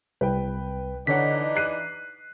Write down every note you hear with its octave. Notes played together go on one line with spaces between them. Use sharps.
C2 B4 G5
D3 E3 D4 D#4 C#5 F#5 B6
F#6 C7 D#7